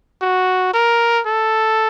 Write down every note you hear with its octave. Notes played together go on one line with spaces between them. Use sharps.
F#4
A#4
A4